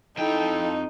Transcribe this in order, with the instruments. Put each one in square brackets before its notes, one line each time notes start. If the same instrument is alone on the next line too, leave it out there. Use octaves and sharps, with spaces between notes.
[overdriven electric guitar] F2 G5 [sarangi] D#4 [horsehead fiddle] E4 A4